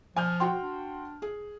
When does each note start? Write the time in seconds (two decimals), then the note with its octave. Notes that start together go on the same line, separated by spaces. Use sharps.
0.16 F3 G#5 F6 G6
0.40 F#4 G5 C6
0.62 D4
1.22 G#4